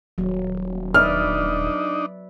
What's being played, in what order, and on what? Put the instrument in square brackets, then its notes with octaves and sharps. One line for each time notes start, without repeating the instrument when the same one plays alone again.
[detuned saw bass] D#1 [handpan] F#3
[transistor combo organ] D4 D#4 [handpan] B4 D5 E5 [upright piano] F6